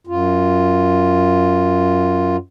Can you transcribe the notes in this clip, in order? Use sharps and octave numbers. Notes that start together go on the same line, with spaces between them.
F#2 F4